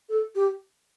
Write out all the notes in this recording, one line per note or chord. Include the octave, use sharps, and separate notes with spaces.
A4
G4